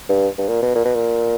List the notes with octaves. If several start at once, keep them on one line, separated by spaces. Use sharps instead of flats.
G2
G2
A#2
B2
A#2
B2
A#2